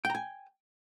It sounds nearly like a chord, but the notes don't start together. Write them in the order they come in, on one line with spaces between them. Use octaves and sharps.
G5 A#5 G#5